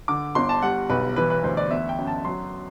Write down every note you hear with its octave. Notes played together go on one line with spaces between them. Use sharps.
D3 D6
G1 C6
A5
G3 F#5
B1 B4
E3 B4
B4
D2 C5
D5
B3 E5
G5
F#2
A5
F#3 C6